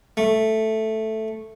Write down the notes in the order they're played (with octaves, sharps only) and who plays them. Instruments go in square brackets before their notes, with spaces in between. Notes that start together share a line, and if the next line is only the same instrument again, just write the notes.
[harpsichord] A3